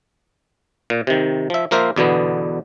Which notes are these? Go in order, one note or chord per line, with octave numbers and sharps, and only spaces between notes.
A#2
C3 D#3
F3 E5
F3 A#3 A#4 C5 E5
E2 B2 D3 B3